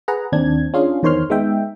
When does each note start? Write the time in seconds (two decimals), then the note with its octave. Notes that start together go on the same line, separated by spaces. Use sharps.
0.08 G#4 B4 F#5 A#5
0.32 D#2 C4 D4 G#6
0.74 C#4 D4 F4 G#4 F5
1.03 E2 D#3 C5 C#5 C6 F6
1.30 G#3 B3 D#4 E5 G5